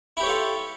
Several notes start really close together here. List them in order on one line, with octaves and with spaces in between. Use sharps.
E4 G4 C#5 A4 F4